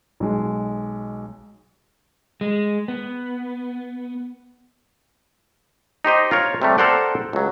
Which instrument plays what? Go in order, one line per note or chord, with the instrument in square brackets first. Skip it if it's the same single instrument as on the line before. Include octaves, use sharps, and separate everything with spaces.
[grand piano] B1 G#3
[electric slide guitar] G#3
B3
[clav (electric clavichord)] D#4 G4 C5 D#5
F4 A#4 C#5
C3 G3 A3
A4 A#4 C5 D5 F#5 G5
C#2 F#3